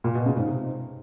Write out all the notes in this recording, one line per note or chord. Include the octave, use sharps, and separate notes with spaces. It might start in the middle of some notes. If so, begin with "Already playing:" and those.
A#2
B2
C#3
G#2
C3